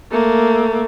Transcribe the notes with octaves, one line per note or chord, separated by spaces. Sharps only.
A3 A#3